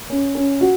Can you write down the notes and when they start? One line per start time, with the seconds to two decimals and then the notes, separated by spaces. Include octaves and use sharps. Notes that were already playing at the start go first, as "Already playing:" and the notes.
0.10 C#4
0.35 C#4
0.61 F#4